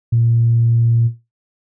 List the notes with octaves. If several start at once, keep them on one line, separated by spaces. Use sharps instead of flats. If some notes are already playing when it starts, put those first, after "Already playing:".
A#2